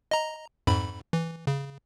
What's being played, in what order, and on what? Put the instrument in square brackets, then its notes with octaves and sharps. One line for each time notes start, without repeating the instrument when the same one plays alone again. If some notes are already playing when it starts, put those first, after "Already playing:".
[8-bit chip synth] D#5 A#5
F2 G#2 B5
E3
C#3